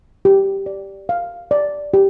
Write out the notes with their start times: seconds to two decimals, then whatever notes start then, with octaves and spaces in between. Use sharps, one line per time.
0.25 G4
0.66 D5
1.09 F5
1.51 D5
1.94 G4